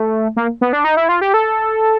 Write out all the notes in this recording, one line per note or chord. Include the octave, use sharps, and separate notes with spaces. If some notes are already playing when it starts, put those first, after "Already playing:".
Already playing: A3
A#3
B3
D4
D#4
E4
F4
G4
A4